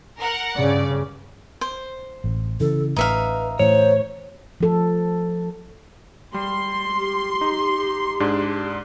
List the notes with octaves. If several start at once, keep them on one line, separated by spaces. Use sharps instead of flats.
A#4 F#5
G2 C#3 D5
C5
A1
C#3 E3 A4
A1 D#4 B4 E5 F5
A2 E3 C5 C#5
F3 A4
G3 C6
G4
D#4
G#2 D4 G#4